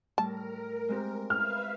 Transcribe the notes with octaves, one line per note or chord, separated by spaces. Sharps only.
A2 G3 A#4 A5
G#3 C4 G4
B4 E5 F5 F6